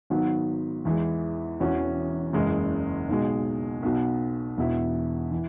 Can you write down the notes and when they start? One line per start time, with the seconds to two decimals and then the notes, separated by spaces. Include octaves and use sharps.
0.10 G#1 G#2 F#3 B3
0.85 E2 E3 G#3
1.60 E1 E2 E3 C#4 F#4
2.33 F#1 E2 C#3 G#3
3.09 B1 B2 G#3
3.83 B1 B2 B3 F#4
4.57 E1 E2 B2 B3 E4
5.31 E3